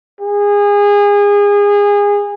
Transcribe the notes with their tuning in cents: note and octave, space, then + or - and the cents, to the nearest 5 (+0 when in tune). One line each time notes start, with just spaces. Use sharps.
G#4 -25